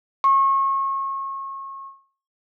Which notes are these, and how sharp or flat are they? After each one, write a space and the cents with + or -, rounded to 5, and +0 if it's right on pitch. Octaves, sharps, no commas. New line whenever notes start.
C#6 -30